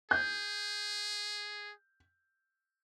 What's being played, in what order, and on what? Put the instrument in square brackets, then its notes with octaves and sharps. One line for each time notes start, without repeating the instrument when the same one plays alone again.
[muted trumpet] G#4 [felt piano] G6